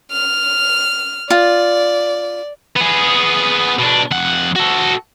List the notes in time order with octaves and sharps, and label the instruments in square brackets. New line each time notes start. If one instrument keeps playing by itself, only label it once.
[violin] F6
[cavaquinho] F4 [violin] D5
[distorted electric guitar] B3 G#4
B2 D4
F2 F#5
F#4 A4